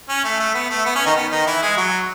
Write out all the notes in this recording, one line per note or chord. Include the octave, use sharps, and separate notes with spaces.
C#4
A3
A3
B3
A3
B3
C#4
D#3 D#4
B3
D#3 D#4
E3 E4
G#3 G#4
F#3 F#4